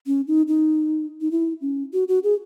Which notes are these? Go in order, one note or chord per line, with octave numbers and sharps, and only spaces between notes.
C#4
D#4
D#4
D#4
E4
C#4
F#4
F#4
G#4